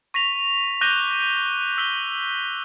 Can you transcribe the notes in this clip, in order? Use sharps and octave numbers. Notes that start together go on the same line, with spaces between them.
C#6 A#6 B6 F7
D6 F#6 G6 A#6 D#7 G7
D#7
E6 B6 G7